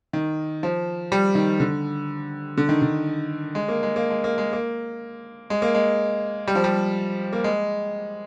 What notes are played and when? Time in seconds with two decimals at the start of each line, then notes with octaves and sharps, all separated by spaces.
0.13 D#3
0.63 F3
1.12 G3
1.35 D#3
1.60 D3
2.58 D3
2.69 D#3
2.82 D3
3.55 G#3
3.68 A#3
3.83 G#3
3.96 A#3
4.10 G#3
4.24 A#3
4.38 G#3
4.53 A#3
5.50 G#3
5.62 A#3
5.74 G#3
6.47 G3
6.55 F3
6.64 G3
7.33 A#3
7.44 G#3